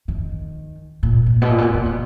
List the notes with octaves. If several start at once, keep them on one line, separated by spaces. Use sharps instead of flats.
D#3
A#2
G#2
B2
A#2
B2
A#2
C#3
B2